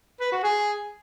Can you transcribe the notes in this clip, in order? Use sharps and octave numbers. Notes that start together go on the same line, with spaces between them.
B4
F#4
G#4